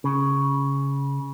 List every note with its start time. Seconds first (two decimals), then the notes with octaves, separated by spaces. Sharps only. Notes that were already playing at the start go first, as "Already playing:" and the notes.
0.04 C#3